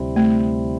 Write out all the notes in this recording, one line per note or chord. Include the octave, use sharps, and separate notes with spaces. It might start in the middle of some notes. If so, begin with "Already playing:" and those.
Already playing: D2 C3 G3 C4 E4
A3